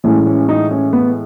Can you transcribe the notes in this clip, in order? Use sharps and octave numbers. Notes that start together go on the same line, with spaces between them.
A2 E3 G#3 C#4
C#4
D#4
C#4
B3